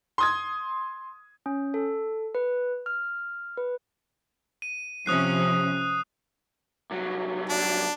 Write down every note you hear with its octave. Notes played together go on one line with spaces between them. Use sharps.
C6 D#6 G#6
C#4
A4
B4
F6
B4
D#7
C3 F3 C#4 D#6 F#6 C7
C2 F#3
D4